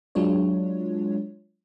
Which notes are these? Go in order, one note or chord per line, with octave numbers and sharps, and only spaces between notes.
F#3 G#3 D4 F4 C#5